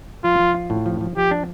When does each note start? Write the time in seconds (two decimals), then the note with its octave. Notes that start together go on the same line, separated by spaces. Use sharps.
0.24 F3 F4
0.39 F3
0.55 F4
0.70 A2
0.86 F3
1.01 F3
1.17 F3 G4
1.31 D4